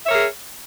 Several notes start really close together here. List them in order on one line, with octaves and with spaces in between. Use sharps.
E5 C#5 A#4 G#4